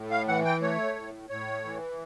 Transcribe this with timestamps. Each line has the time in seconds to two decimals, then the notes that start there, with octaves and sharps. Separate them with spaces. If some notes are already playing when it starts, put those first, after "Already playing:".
Already playing: A2
0.11 F5
0.28 E3 F#5
0.45 G5
0.61 A3 C#5
0.95 A2
1.29 A2 C#5
1.64 E3